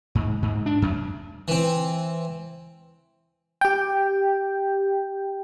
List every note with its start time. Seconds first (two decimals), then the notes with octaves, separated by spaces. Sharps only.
0.15 G#2
0.42 G#2
0.66 D4
0.82 F#2
1.48 E3 C4
3.61 G4 G5